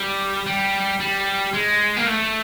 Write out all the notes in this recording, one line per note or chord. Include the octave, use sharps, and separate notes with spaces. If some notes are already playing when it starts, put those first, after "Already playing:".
Already playing: G3
G3
G3
G#3
A#3
A3